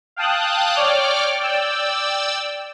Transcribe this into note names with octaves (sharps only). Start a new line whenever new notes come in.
F5 G5 A5 D#6 F#6
C#5 D5 G5 D6 F6
D5 G5 E6